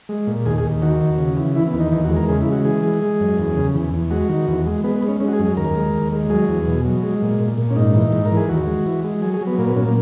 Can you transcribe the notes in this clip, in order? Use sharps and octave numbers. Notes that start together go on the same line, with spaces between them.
G#3
A#2
D#2 G#4
G#4
D#2
D#3 F#4
D#2
C#3
E3
E3 E4
B3
D#2
D#4
E2 D#4
F#4
G#3
A#4
C#3 G#4
E4
G#3
F#4
E3 G#4
G#3
G#3
F#2
E2
C#3
E2
E2
G#3 F#4
D#3
E2
G#3
G#3 B3
B3
G#3
C#4
G#3 C#4
F#4
G#4
F#2
G#4
D#2 A#4
G#3
D#2
G#3
F#3 G#4
E2
B2
F#3
G#3
A#2
A#2
A#2
C#4
G#2 D#4
E3
G#2
A#4
E3
G#4
D#2 F#4
G#3
E3
G#3
F#3 G#4
G#4
F#3
B3
A#2 A#3
B3
A#2 C#4
A#3